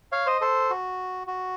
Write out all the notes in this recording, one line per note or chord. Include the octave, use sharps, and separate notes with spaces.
C#5 F5
C5 D#5
A4 C5
F#4
F#4